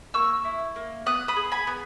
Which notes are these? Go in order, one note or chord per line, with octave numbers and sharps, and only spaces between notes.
A#3 C#6 E6
E4
A#3
B3 D#6 F#6
B5 D#6
G#4
G#5 B5
B3